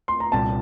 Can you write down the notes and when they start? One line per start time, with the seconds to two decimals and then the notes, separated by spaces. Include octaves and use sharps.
0.08 C6
0.20 A#5
0.32 C2 A#2 G3 C4 A5